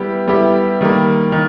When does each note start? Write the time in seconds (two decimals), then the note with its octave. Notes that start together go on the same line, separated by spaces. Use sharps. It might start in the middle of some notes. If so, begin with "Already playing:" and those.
Already playing: G3 B3 E4 G4
0.28 G3 B3 E4 G4
0.81 D#3 G3 A#3
1.32 D#3